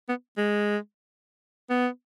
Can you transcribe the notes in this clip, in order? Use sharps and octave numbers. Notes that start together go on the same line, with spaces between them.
B3
G#3
B3